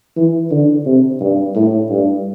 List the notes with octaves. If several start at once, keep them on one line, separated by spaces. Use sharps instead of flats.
E3
D3
C3
G2
A2
G2